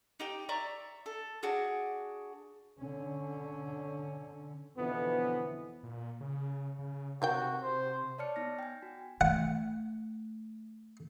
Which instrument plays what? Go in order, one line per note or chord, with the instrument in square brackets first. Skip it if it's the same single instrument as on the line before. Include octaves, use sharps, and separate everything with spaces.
[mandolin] D#4 G4 G5
D5 E5 A#5 C#6
A4
D4 F#4 G#4
[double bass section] D3 C#4
[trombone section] F2 B2 D3 E3 F3 B3
[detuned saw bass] A#2
C#3
C#3
[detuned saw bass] C3 [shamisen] D#3 F#3 G5 [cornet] F#4
[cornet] C5
[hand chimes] C#5 D5 A5 F6 C#7
B3 D#4 F6 A#6
G5 G#5
F#4
[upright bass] A3 [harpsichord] F#5